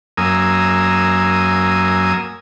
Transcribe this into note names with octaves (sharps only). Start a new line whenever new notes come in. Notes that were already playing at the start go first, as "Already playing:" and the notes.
F#2 A#3 G#5 D#6 E6